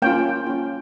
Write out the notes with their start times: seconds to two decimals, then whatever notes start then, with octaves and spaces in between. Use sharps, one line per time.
0.02 A#3 C#4 F4 G5
0.47 C#4 F4